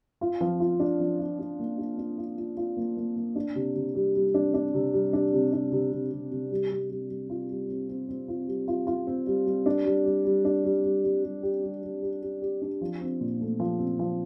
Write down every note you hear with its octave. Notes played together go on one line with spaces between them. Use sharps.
F4
F3
F4
D4
F3
F4
D4
A#3
D4
D4
F4
F4
F4
A#3
A#3
A#3
D4
C3
C3
G3
G3
D4
D4
C3
G3
D4
C3
D4
C3
C3
C3
C3
G3
G3
G3
G3
F4
G3
C4
C4
C4
F4
G3
F4
F4
C4
G3
G3
D4
G3
G3
G3
D4
G3
G3
G3
G3
G4
G3
G3
G4
G4
G4
D4
F3
C4
A#2
A3
F3
C4
F3